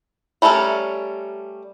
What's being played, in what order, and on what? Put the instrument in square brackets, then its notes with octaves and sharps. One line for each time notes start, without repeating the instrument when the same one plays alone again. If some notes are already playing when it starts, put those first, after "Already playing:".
[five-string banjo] G3 A3 C#4 A4 A#4